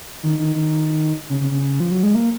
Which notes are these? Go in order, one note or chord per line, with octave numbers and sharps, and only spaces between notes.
D#3
D#3
D#3
C#3
C#3
C#3
F3
F#3
G#3
A#3